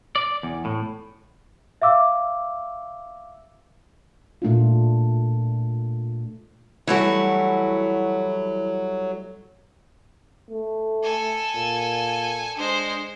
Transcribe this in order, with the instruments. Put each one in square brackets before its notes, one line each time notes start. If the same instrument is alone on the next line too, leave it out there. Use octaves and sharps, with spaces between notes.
[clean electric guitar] D5
E2
A2
[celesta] E5 F5 D6 E6
[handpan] A#2 A3 D4 F4
[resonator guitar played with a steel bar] E3 F#4 [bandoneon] F#3 [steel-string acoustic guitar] G3 A3 E4
[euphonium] A3
[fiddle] A4 G#5
[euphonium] A#2
[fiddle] G#3 C5 [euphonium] D4